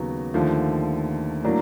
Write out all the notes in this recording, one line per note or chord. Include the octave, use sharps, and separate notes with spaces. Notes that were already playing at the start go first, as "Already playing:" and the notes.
Already playing: D#2 C#3 F#3 B3
D#2 D3 F3 A3
A2 F#3 A#3 D4